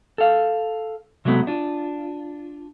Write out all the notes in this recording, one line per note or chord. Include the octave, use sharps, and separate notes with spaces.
A4 F5
C3 F#3 G#3 A3 B3
D4 F4